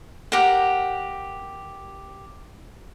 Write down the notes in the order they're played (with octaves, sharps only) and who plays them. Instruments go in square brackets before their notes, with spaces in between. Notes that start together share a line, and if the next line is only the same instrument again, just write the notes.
[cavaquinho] G4 A#4 F#5